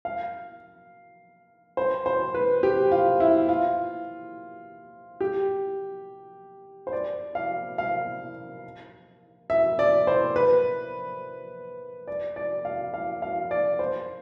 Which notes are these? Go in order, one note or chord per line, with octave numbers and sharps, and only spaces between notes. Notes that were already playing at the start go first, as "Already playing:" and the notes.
F5
C5
C5
B4
G4
F4
E4
F4
G4
C5
D5
F5
F5
E5
D5
C5
B4
D5
D5
F5
F5
F5
D5
C5